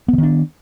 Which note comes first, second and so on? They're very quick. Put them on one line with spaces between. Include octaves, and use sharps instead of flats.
B3 D3 D#3 D4